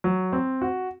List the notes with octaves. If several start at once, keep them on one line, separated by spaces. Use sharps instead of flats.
F#3
C4
F#4